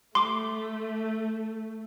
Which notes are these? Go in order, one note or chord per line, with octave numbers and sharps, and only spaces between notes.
A3 C6 D6